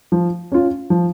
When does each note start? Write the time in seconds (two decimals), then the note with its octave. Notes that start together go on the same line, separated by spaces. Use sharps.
0.12 F3
0.52 C#4 F4
0.90 F3